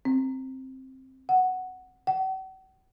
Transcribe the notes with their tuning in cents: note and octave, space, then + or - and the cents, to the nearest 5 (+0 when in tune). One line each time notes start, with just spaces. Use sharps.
C4 +10
F#5 +0
F#5 +45